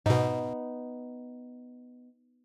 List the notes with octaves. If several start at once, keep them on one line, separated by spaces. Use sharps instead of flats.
G#2 B2 B3 D#4